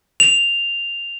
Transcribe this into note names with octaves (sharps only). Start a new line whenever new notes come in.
F7